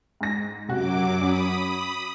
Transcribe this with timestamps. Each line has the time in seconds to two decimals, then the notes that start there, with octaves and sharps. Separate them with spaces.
0.21 G#2 A#6
0.69 F#2 C3 F#3 F#4 D6
1.21 C#4 B5 D#6